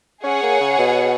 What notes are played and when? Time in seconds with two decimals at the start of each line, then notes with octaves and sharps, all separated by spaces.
0.24 C#4 G#4 C#5 F#5
0.43 A#3
0.61 C#3
0.79 B2